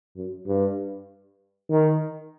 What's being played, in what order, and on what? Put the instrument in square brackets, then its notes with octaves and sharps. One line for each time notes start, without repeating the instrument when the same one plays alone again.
[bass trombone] F#2
G2
D#3